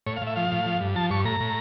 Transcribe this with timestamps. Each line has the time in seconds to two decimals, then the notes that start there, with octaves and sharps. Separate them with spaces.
0.07 A2 C#5
0.16 F5
0.22 A2
0.27 E5
0.36 F3 F5
0.52 A2
0.66 F3
0.80 G2
0.96 F3 A5
1.10 G2 C#6
1.25 A2 A#5
1.40 A2